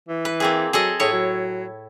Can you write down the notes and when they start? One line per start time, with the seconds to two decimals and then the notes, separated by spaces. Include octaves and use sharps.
0.08 E3
0.25 B4
0.40 A#3 C4 G#4
0.73 F#3 G#4 A4 D#5
1.00 A2 E4 G#4 C#5
1.12 F#3